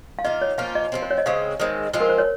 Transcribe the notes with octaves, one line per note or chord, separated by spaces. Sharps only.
F5
D#3 A#3 F4 D#5
C#5
F3 A#3 C#4 F4 F5
D#5
F3 G#3 C4
C5
C#5
D#5
C#3 G#3 C4 F5
D#3 G#3 C4
F3 G#3 C4 F4
A#4
C5
C#5